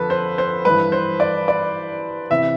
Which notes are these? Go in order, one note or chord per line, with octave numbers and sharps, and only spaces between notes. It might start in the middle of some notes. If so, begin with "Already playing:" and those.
Already playing: F2 D3 F3 A4 B4
C5
C5
G2 E3 B4
C5
D5
D5
C3 E3 E5